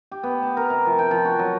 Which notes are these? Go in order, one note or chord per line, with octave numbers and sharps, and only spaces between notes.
G4
B3
A5
A#4
C3
F3
G5
F3
F#4
F#3